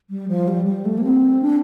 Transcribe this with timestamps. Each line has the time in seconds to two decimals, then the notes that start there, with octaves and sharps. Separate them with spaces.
0.10 G3
0.28 F3
0.48 G3
0.66 G3
0.85 A3
0.98 A#3
1.04 C4
1.42 D4